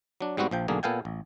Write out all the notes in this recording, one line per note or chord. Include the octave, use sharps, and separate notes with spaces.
F#3 D4
G#2 G3 B3 C4 F#4
A#1 F3 G5
B1 D3 A#3 G#4
A#2 B3 A4 F5 G5 G#5
A1